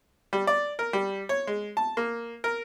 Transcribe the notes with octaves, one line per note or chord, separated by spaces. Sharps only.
G3
D5
A#4
G3
C#5
G#3
A5
A#3
A#4